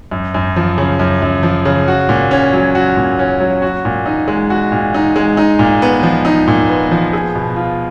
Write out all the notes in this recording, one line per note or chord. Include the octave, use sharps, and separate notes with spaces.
F#2
F#2
F3
C#3
F#2
F#2
F3
C#3
F#4
A#2
C#4
F#3
F#4
A#2
C#4
F#3
F#4
A#2
D#4
G#3
F#4
A#2
D#4
G#3
D#4
A#2
B3
F3
D#4
A#2
B3
F3
G#4
B2
F4